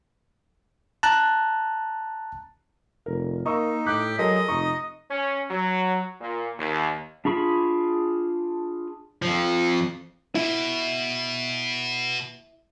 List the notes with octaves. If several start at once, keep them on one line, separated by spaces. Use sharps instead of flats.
A5 A#5 F#6
F1 A#4
A#3 D#4 D#5 C#6 E6
A2 G4 D6 F#6
F#3 G#3 A4 A#4 D#5
F1 D#4 C#6
C#4
F#3
A#2
D#2
D4 F4 G#4 B5 C#6
F2 F3
B2 E4